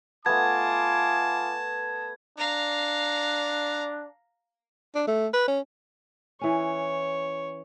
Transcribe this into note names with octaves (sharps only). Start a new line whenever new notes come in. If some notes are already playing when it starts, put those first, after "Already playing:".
A3 B3 F4 G#5 A5 D6 G#6
D4 F5 A#5
D4
A3
B4
C#4
E3 C#4 C#5